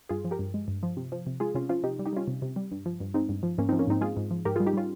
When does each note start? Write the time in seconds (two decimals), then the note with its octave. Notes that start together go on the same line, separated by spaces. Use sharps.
0.09 G2 F4 G#4
0.25 F3
0.31 G4 A#4
0.39 G2
0.54 G#3
0.68 G2
0.83 F3
0.97 C3
1.12 F3
1.27 C3
1.40 G#3 F4 G#4
1.55 C3 C#4 F4
1.69 F3 C#4 F4
1.83 C3 D#4 G4
1.99 G3
2.06 D#4 G4
2.13 G3 C#4 F4
2.28 C3
2.42 C3
2.56 G3
2.72 G2
2.86 F3
3.00 G2
3.14 G#3 C4 D#4
3.29 G2
3.43 F3
3.58 G#2 A#3 C#4
3.69 C4 D#4
3.73 F3
3.79 A#3 C#4
3.87 G#2 C4 D#4
4.01 G#3 F4 G#4
4.17 G#2
4.31 F3
4.45 G#2 G4 A#4
4.56 F4 G#4
4.60 G3
4.66 D#4 G4
4.73 G3 C#4 F4